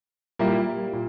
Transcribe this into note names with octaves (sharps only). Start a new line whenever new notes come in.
A#2 G3 A#3 E4 G4
A#2